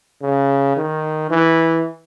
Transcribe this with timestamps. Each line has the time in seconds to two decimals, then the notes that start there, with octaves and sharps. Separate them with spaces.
0.22 C#3
0.77 D#3
1.30 E3